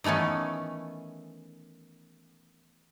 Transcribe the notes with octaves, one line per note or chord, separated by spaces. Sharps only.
D#3 E3 A3 B3 C#4